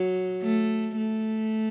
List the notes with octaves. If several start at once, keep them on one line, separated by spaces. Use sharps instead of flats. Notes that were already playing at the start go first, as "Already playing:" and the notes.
Already playing: F#3
A3
A3